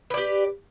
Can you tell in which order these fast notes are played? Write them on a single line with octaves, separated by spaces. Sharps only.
B4 D5 G4